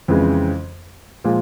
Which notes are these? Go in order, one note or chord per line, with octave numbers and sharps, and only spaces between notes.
F2 C#3 E3 G#3
A#2 F3 G#3